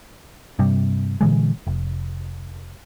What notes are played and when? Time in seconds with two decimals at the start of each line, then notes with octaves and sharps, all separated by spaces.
0.59 G2 C3 G3
1.21 A#2 D3 E3 G#3
1.67 F1